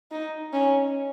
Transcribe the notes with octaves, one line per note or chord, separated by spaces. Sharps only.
D#4
C#4